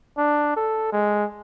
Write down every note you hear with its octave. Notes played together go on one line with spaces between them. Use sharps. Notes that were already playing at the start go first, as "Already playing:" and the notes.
D4
A4
G#3